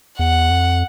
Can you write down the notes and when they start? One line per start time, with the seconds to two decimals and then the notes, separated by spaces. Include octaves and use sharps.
0.19 E2 F#5
0.50 F2